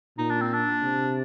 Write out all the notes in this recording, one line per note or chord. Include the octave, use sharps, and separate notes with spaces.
A#2 D#4
D4
C4
D4
C3